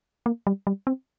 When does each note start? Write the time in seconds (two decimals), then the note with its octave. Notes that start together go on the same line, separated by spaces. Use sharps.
0.26 A#3
0.47 G3
0.67 G3
0.87 C4